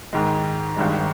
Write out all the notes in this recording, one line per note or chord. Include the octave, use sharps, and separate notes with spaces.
G#2 D#3 G#3
G#1 G2 D#3 G#3